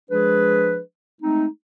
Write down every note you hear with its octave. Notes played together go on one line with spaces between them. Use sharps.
F3 G#3 D4 G#4 B4
G#3 A3 C4 D#4